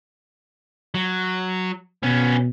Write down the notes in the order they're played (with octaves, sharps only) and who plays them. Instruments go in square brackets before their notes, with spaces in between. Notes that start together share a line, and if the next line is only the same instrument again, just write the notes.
[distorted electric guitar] F#3
[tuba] B2 [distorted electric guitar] B3 C#4